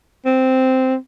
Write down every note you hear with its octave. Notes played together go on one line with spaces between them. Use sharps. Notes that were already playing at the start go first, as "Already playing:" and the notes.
C4